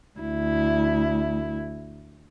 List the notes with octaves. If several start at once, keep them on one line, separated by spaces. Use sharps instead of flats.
D2 E4